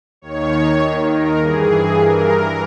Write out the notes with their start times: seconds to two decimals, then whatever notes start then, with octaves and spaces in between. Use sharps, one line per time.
0.22 D#2 D#3 C#5
1.09 A#4
1.39 G2 E3 G#4
1.98 A#4